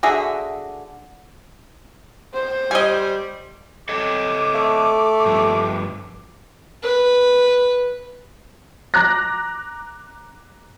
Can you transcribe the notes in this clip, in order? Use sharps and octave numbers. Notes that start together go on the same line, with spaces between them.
D3 F#4 G#4 E5
C5
G3 D#5 G#5
A4 C#5 D#5 D6
A3
G2 F3
B4
A#5 D6 F#6 A#6